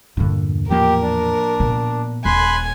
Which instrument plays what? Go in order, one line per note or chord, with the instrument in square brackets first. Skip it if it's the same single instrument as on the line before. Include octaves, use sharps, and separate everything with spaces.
[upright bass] E2 A#2 [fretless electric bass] G2 D3
[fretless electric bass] A2 F3 A#3 [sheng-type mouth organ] G4 [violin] A#4
[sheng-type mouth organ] D4
[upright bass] A#2 B3
[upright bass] D#1 [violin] G#5 [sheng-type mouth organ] B5 C6 F#6